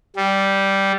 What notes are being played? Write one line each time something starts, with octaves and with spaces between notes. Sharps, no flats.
G3